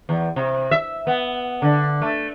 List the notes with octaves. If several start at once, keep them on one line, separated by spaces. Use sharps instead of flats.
E2
C3
E5
B3
D3
A3